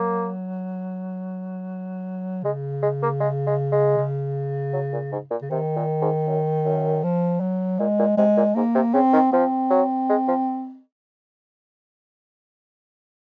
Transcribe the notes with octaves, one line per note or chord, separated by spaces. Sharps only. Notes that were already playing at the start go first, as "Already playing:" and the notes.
Already playing: F#3 A#3
C#3 G#3
G#3
A#3
G#3
G#3
G#3
C#3
F#3
A#2
G#2
A#2
C#3
C3 D#3
A#2
G#2
F#2
F#2
F3
F#3
A#2 G#3
A#2
C3 G#3
A#2
G#2 A#3
C3
C#3 C4
D#3
F3 C4
F#3
G#3
F3